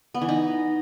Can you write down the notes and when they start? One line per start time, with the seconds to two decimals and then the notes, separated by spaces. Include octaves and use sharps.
0.14 B3
0.22 E3
0.29 D#4